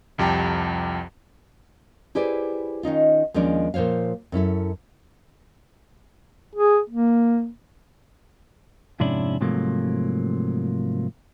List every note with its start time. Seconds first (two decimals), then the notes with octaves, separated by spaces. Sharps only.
0.18 C2 F2 G4 G5 A5 A#5
2.15 E4 G4 G#4 B4 C5 D5
2.83 D#3 C#4 D#4 F4
3.34 D#2 F3 G#3 C#4 D4 D5
3.74 A#2 F3 C5 C#5 F5
4.32 F#2 C#4 E4 A4
6.55 G#4
6.90 A#3
9.00 F2 G#2 C3 C#4 D4 E4
9.41 G#2 C3 F3 F#3 A3 A#3